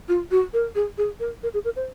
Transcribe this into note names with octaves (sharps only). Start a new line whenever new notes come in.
F4
F#4
A#4
G#4
G#4
A#4
A#4
G#4
A#4
C5